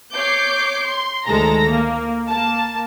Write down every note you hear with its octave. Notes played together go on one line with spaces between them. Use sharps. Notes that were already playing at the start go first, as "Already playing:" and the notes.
C#5 D6 G6 C7
C6
D2 D#3 G#3 A4 A#5 A#6
A#3
A#3 A5